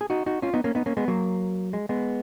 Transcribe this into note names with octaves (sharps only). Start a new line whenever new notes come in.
G#4
D#4 F#4
D#4 F#4
C#4 F4
B3 D#4
A#3 C#4
B3 D#4
A#3 C#4
G#3 B3
F#3 A#3
G#3
G#3 B3